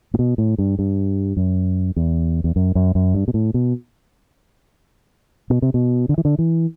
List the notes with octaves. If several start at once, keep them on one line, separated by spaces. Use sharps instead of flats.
A2
B2
A2
G2
G2
F#2
E2
E2
F#2
F#2
F#2
G2
B2
A2
B2
B2
C3
B2
D3
E3
D3
E3